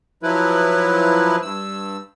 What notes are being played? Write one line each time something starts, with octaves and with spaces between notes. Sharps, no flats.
F3 F#3 E4 B4
G2 E6